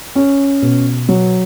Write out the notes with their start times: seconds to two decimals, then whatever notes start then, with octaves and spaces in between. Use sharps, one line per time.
0.16 C#4
0.62 B2
1.09 F#3